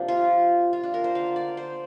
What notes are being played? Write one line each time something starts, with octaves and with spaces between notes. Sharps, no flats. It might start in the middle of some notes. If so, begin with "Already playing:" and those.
Already playing: C3 F3 A#3 D4
F4
F4
D4
A#4
C5
D3 A#3 F5
D5
C5